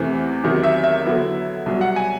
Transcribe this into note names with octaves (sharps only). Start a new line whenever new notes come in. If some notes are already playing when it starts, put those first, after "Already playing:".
Already playing: E2 C3 E3 A3 C4
E2 C3 D#3 F#3
E5
E5
D3 F#3 B3 E4
C2 B2 F#3
F#5
G#5